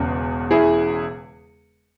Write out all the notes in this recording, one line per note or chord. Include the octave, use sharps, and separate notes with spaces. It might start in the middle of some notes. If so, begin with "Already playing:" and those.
Already playing: E1 E2 C#3
E4 G#4